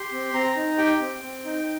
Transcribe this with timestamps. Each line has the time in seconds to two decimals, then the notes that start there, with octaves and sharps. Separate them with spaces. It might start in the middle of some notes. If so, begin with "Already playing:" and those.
Already playing: G4 C6
0.12 C4
0.33 C4 A#5
0.56 D#4
0.78 G4 G5
1.00 C4
1.22 C4
1.44 D#4